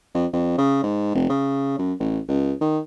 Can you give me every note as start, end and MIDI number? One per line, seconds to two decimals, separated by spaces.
0.14 0.26 41
0.33 0.54 41
0.58 0.79 49
0.83 1.14 44
1.15 1.27 29
1.29 1.74 49
1.78 1.93 42
2.00 2.19 33
2.28 2.53 37
2.61 2.79 51